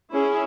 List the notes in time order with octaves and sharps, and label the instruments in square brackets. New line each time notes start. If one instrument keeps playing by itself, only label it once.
[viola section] C#4 E4 G#4